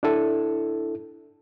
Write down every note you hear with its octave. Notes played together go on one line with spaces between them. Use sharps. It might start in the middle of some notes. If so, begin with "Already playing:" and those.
D4 E4 A4